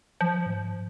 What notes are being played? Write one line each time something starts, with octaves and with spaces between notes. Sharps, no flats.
F3
G#2